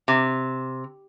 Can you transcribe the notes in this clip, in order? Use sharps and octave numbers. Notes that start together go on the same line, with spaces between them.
C3